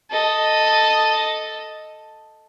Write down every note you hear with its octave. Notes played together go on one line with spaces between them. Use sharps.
A4 D#5